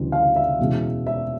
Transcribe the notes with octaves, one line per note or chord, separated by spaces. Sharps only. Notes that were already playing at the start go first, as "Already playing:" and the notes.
Already playing: D2 C#3 E3 G3
F5
E5
E2 B2 G#3 C#4
E5